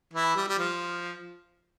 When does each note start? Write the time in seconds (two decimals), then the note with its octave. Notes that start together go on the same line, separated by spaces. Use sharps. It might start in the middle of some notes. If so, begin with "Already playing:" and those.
0.14 E3 E4
0.36 G3
0.48 G3
0.58 F3